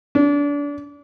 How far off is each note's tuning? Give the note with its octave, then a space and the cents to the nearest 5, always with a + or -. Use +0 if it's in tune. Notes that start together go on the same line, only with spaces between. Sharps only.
D4 -30